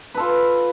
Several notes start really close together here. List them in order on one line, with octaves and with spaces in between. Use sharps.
B4 A4 F4